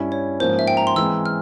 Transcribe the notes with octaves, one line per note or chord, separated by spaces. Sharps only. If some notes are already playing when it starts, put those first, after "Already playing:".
Already playing: G2 G3 C#4 E4
C#5
G#2 F3 A#3 C#4 C5
E5
G5
A#5
C6
E3 G#3 C4 E6
F6